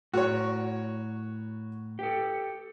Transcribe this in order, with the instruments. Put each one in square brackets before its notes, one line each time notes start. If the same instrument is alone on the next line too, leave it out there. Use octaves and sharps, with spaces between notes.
[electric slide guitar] A2 A#4 [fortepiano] F#4 C#5
[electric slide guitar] G4 A4